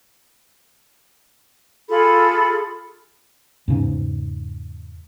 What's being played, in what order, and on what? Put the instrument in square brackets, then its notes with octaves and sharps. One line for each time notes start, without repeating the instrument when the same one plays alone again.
[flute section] F4 G#4 A4 B5
[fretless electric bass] E2 G#2 C#3 C#4